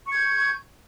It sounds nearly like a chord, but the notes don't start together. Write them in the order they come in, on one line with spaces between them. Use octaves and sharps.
C#6 G#6 G6